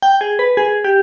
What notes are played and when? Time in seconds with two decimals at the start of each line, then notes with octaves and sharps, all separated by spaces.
0.02 G5
0.21 G#4
0.39 B4
0.57 G#4
0.84 G4